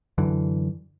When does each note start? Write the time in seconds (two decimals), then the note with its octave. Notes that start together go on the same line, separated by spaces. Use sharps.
0.18 F#2 D3 E3